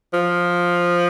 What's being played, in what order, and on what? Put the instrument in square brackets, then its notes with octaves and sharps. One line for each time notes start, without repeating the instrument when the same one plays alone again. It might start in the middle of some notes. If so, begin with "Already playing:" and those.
[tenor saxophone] F3